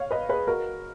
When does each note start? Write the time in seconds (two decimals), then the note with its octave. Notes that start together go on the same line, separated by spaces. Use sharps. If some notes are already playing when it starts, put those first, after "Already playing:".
Already playing: G#2 C#5 F5
0.11 B4 D#5
0.29 G#4 B4
0.47 F#4 A#4